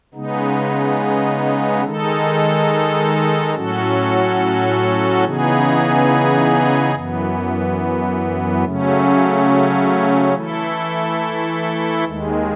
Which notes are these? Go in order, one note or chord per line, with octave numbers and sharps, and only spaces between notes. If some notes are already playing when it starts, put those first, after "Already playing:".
C#3 G#3 B3 D#4
D#3 G#3 D#4 A4
A2 F#3 C#4 F#4 A4
C#3 E3 B3 D#4 G#4
F#2 E3 B3
C#3 F#3 A3 C#4
E3 A3 E4 A4
D#2 D#3 G#3